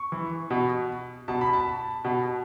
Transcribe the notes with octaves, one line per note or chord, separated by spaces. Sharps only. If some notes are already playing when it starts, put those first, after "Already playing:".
Already playing: C#6
E3
B2
B2 A5
B5
A5
B2